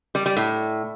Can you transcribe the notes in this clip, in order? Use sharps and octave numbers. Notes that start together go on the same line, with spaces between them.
G3
G3
A2